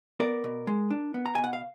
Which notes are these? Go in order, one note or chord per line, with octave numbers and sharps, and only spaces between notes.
B3 A#4 D5
B2
G#3
D4
B3
A#5
B2 G#5
F#5
F5